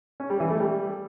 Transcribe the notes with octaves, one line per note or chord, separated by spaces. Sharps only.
C#4
G3
E3
A3
G3